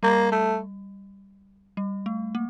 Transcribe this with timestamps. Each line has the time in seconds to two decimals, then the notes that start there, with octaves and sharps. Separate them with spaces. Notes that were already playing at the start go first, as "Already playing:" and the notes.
0.03 G3 A#3
0.32 A3
1.77 G3
2.06 A3
2.35 A#3